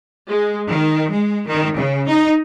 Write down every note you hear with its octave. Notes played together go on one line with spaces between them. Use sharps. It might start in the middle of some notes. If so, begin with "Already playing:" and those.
G#3
D#3
G#3
D#3
C#3
D#4